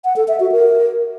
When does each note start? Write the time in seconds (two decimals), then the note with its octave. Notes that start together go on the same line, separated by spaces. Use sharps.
0.04 F#5
0.16 A4
0.28 E5
0.40 F#4
0.52 A#4